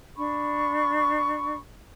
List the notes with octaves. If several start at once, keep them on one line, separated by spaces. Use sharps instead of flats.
D4 B5 C#6